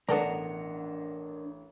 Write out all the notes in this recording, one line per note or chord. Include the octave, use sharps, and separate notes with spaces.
A1 B3 D4 A4 A#4 D5 F#5 A#5